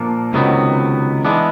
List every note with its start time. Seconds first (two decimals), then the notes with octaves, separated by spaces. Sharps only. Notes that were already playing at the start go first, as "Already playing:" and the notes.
Already playing: A#2 F3 A#3 D4
0.33 C#2 C3 D#3 F#3 B3
1.25 E3 G#3 B3 D4